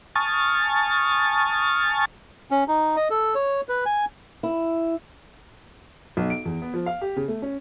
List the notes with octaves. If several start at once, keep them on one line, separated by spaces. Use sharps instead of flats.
G#5 A5 C#6 D#6 F6 A6
C#4
D#4
D#5
A4
C#5
B4
G#5
E4
B1
D7
E2
B3
F3
F5
G4
C#3
A3
C#4